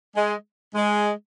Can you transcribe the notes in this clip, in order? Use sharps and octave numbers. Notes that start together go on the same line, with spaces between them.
G#3
G#3